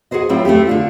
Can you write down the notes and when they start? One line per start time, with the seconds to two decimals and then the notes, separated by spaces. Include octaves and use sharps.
0.11 F#4 G#4 A4 C5 D#5
0.29 A2 F#3 C4 E4 F4
0.45 A3 C4 E4 G4
0.67 D3 D4 F4